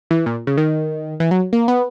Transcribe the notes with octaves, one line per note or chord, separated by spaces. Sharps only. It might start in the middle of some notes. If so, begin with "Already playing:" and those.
E3
A#2
C#3
D#3
E3
F#3
A#3
B3